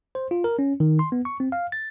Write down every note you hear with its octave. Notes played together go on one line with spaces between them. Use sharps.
C5
F4
A#4
C#4
D#3
C6
B3
C#6
C4
F5
A6